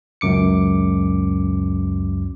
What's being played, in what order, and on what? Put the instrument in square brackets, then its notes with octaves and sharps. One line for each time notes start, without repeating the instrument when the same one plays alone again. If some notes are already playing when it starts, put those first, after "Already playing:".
[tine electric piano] C#2 F#2 D6 C#7